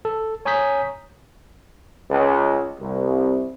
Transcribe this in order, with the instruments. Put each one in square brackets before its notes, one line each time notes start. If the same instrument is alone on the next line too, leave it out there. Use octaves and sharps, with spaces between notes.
[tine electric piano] A4
C#5 G#5 A#5 D#6 G6 B6
[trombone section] C#2
C2